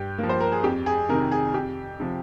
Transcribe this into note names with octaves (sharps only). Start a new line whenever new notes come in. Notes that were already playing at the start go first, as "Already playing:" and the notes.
Already playing: G2 G4
F3 A#3
C5
A#4
G#4
F2 G4
G#4
C3 D#3 A#4
G#4
F2 G4
C3 F3